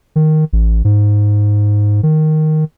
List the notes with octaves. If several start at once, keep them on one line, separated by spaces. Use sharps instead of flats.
D#3
A1
G#2
D#3